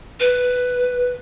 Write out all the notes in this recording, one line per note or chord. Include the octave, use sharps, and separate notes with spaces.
B4